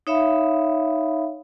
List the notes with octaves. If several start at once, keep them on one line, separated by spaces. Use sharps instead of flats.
D#4 C#5 E5 F5 B5